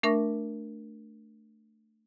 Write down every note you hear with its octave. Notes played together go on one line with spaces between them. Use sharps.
A3 D4 A#4 E5 C#6 A#6